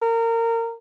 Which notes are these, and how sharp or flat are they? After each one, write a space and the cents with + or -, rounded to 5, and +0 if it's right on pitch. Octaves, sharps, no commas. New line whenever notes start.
A#4 -25